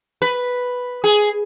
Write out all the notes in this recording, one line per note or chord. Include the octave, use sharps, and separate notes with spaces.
B4
G#4